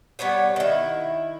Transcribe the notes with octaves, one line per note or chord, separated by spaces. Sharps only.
G3 B3 C#5 F#5
D#3 E4